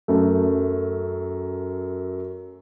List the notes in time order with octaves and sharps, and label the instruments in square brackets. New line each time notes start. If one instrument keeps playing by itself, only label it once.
[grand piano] F#2 A3